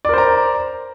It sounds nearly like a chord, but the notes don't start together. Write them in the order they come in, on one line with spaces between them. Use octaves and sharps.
D5 A#4 C5 A#5